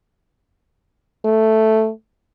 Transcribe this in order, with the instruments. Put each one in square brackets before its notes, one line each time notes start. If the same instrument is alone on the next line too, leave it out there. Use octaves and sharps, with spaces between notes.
[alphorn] A3